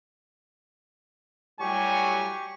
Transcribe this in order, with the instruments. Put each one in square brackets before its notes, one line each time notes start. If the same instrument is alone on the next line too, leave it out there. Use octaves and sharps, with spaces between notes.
[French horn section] A2 F#3 G3 [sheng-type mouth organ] G4 C#6 [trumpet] G#5